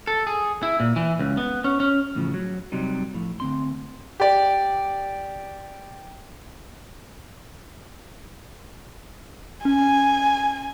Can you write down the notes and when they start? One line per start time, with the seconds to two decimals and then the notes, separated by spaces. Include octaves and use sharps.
0.07 A4
0.27 G#4
0.63 E4
0.80 A#2
0.96 E3
1.19 C#2
1.37 B3
1.64 C#4
1.80 C#4
2.15 E2 A2 C#3 F3
2.34 F#3
2.72 C3 F#3 G3 D#4
3.14 A2 F3
3.40 D2 C4 C6
4.20 G4 D5
9.65 C#4 G#5